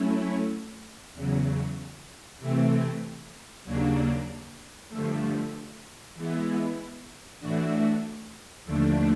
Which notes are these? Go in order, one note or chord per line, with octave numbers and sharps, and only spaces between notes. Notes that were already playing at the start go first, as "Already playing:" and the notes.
Already playing: F#3 A3 C#4 E4
E2 C#3 F#3
C3 E3 A3 C4
D#2 C#3 F#3 A#3 D4
G2 D3 F3 A3
E3 G#3 B3 E4
A2 E3 A3 D4 F#4
D#2 D3 F3 A3 D4